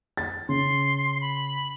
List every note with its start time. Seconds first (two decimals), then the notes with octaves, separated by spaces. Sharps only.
0.17 A6
0.49 C#3 C6
1.21 B5